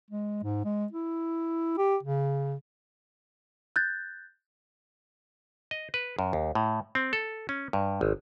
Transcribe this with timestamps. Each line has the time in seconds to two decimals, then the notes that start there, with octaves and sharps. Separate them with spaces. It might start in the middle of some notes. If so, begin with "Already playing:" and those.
0.11 G#3
0.43 G#2
0.65 G#3
0.92 E4
1.78 G4
2.03 C#3
3.76 F#6 G6 A6
5.71 D#5
5.94 B4
6.19 F#2
6.33 D#2
6.55 A2
6.95 C4
7.13 A4
7.49 C#4
7.73 G2
8.01 G#1